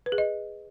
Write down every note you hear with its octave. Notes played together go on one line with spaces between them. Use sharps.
B4
G#4
D#5